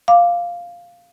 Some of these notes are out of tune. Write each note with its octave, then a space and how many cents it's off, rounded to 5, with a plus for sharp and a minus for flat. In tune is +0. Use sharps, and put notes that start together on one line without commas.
F5 +0 D6 +0